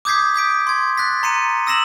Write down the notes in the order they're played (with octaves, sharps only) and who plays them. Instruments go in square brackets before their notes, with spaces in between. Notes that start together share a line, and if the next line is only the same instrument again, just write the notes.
[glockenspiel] D6 D#6 G6 G#6 B6 C7
D#6 G6 B6 D7
C6 G#6
F#6 A6 B6
A#5 C6 C7 C#7 D#7
D#6 E6 A#6 C7 E7 F#7